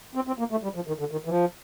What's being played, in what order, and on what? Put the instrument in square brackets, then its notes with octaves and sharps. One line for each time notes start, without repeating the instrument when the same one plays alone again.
[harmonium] C4
C4
A#3
A3
G3
F3
D#3
D3
D#3
E3
F3